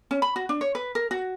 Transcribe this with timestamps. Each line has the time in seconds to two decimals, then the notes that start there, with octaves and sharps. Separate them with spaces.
0.11 C#4
0.22 B5
0.36 F#4
0.49 D4
0.61 C#5
0.75 B4
0.95 A#4
1.11 F#4